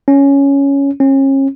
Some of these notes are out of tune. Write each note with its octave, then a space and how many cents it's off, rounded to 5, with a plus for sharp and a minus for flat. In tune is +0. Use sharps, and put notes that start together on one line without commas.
C#4 +5
C#4 -35